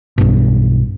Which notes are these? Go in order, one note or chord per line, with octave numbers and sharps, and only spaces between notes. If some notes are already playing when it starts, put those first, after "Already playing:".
B1 G2 B2